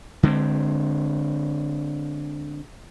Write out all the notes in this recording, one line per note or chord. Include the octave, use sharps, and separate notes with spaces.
D3 G#3 B3 C4